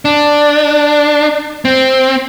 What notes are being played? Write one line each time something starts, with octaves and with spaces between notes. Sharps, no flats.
D4
C4